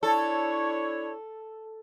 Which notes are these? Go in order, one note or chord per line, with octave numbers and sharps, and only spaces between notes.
D4 E4 A4 C#5